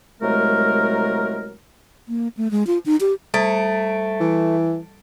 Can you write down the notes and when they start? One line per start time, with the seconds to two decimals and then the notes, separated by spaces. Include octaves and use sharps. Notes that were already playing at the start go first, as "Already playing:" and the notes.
0.21 C2 F#3 G#3 A3 A#4
2.09 A#3
2.37 A3
2.51 G#3
2.67 F4
2.86 D#4
3.00 G4
3.34 G3 A3 A6 D7
4.21 E3